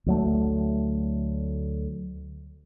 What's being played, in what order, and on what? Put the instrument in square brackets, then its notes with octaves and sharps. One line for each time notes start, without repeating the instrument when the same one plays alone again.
[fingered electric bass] D2 F#3 A3